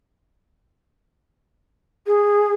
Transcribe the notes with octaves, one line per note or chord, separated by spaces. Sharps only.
G#4